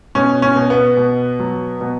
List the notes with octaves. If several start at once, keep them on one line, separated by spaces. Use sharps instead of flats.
B2 C#4
C#4
B2
B3
B2
F#3
B2